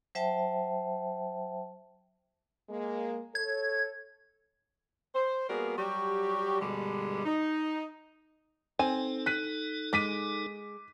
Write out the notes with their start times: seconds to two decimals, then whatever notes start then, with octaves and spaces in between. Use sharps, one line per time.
0.15 F#3 C5 E5 G5 A5
2.69 G#3 A#3
3.35 A4 C#5 G#6
5.15 C5
5.49 G3 A#3 B3 F#4 G#4 A#4
5.77 F#3 G3 F#4 G4
6.61 G2 B2 D3 G3 G#3
7.25 D#4
8.79 C4 D#4 A4 G#5
9.26 F#6 B6 D#7
9.93 G#3 D6 B6 D#7